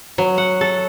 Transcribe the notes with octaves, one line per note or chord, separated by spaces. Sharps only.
F#3
F#5
A4